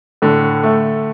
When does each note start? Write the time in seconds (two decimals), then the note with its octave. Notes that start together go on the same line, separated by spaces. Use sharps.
0.22 A2 D3
0.64 A3